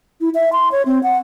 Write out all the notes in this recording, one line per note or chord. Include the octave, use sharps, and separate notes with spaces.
E4
E5
C6
C#5
C4
F#5